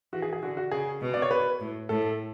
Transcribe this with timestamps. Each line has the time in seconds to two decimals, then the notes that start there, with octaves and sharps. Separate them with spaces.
0.13 E3 F#4
0.22 G#4
0.33 G#4
0.42 D3 F#4
0.57 F#4
0.71 C#3 G#4
1.01 B2
1.14 D5
1.22 C#5
1.31 B4
1.60 A2
1.89 A2 A4